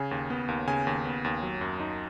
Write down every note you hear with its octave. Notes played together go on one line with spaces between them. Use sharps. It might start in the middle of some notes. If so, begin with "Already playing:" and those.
Already playing: C#3 G#5
D#2
B3
D#2
C#3 G#5
D#2
B3
D#2
F#3
F#2
D#4